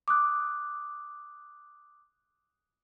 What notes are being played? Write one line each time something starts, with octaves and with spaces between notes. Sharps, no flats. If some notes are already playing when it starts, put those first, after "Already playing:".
D6 D#6 F#6